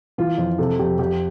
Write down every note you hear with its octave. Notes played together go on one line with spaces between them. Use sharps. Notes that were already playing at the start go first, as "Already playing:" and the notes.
E3 F4
F2
C3 A4
F2 G4
F2 G4